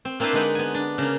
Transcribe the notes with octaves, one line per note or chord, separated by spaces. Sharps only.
C4
A#3 C4 D4 E4 B4 C5
D3 G#3 D#4 B4 F#5 G5
B3 G#5
D4
C#3 A#3